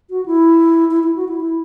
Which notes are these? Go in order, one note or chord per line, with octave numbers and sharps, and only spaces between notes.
F#4
E4
E4
E4
F#4
E4
E4